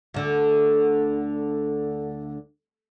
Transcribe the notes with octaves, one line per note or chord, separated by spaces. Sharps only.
D2 D3